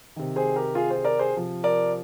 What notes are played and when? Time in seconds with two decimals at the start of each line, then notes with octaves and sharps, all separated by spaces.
0.16 C3 D#3
0.36 G#4 C5
0.56 G4 A#4
0.75 F4 G#4
0.90 G#4 C5
1.04 A#4 D5
1.19 G#4 C5
1.35 C3 F3
1.64 A#4 D5